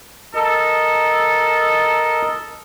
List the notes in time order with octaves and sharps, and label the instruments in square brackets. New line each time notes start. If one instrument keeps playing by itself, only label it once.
[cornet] A4 [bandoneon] A#4 D#5